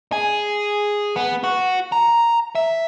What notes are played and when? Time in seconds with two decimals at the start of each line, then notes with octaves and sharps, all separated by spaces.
0.12 G#4
1.16 B3
1.44 F#4
1.92 A#5
2.55 E5